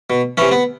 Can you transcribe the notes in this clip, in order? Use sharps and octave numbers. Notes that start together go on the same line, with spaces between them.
B2
C3 E3 C#4
B3